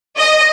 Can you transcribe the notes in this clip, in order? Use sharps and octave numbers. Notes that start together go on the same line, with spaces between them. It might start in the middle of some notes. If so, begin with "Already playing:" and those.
D#5